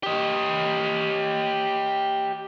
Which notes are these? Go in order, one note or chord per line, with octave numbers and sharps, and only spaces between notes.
G4 D#5